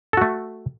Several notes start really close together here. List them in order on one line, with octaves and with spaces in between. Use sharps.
A4 F#4 A3